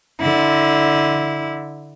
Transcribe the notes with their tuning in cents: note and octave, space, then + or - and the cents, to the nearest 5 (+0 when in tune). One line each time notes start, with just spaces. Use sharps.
D3 +0 E4 -15